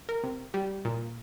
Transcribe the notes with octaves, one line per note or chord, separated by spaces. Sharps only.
A#4
C3
G3
A#2